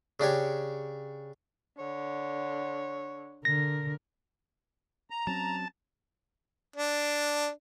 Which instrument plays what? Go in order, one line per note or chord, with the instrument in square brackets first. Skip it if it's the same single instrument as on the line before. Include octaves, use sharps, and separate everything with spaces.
[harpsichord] C#3 D4 G4 C#5
[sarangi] D3 [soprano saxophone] C#5
[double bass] D3 [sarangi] A#4 [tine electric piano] A#6
[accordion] A#5
[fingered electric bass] F#3 C4 C#4 [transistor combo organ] A5
[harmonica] D4